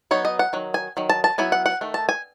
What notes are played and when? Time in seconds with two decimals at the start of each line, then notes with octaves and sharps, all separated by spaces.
0.11 F#3 B3 D#4 C#5
0.25 D#5
0.39 F#5
0.53 D#3 F#3
0.74 G#5
0.97 D#3 F#3
1.09 A5
1.24 A5
1.38 F#3 B3 E4 G#5
1.52 F#5
1.66 F#5
1.81 D#3 A3
1.94 A5
2.09 G#5